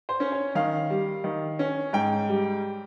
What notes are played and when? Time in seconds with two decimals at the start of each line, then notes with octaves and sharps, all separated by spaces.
0.09 C5
0.20 C#4
0.32 C#5
0.55 D#3 F5
0.90 G3
1.24 D#3
1.59 C#4
1.93 G#2 G5
2.29 G3